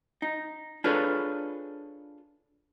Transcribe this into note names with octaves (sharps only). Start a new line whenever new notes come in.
D#4
D4 F4 G#4 A4 B4 C#5